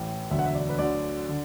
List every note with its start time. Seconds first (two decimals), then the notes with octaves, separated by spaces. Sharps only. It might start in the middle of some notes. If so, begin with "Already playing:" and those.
Already playing: A1 A2 E3
0.30 E1 D2 D3 F#3 E5
0.39 F#5
0.45 E5
0.55 D5
0.69 B4
0.78 D2 D3 F#3 D5
1.29 D3